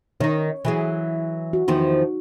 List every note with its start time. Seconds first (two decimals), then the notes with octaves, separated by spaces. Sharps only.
0.20 D#3 D#4 C#5
0.65 E3 F#3 G#4
1.53 F#4
1.68 E2 D#3 F3 D#4